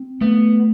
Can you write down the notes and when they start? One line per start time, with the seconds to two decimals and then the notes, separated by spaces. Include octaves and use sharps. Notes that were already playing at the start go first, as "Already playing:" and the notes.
Already playing: C4
0.21 A3 B3